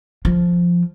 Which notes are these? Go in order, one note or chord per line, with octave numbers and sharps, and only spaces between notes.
F3